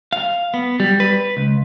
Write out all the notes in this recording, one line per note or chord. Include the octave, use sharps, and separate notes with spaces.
F5
B3
G3
B4
C#2